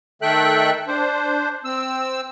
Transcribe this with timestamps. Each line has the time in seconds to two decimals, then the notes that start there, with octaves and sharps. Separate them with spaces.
0.22 D#3 A3 A4 E5 G5 F#6
0.87 D4 C5
1.65 C4 E6